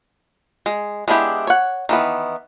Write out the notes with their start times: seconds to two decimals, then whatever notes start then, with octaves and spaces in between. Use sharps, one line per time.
0.66 G#3
1.08 G#3 B3 D4 E4 G4
1.47 C#5 F#5
1.89 D#3 E3 B3